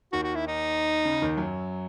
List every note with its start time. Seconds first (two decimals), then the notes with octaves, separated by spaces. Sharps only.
0.12 D#2 D#3 F#4
0.24 F#4
0.35 E4
0.47 D#4
1.05 C#3
1.22 D#2 D#3
1.37 F#2 F#3